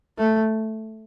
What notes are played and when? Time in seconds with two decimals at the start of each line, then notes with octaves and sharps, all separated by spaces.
0.18 A3